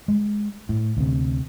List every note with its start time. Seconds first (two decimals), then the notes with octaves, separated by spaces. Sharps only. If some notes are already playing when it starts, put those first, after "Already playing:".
0.08 G#3
0.69 A2
0.97 D2 C3